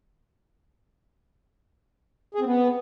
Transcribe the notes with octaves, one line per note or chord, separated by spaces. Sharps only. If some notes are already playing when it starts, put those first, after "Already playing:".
G#4
C4
B3